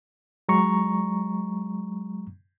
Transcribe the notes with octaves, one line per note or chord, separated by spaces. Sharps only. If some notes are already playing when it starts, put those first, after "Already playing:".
F#3 G#3 A#5 C#6